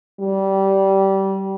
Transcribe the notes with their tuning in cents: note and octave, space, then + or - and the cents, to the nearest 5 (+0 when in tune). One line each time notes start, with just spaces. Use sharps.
G3 -20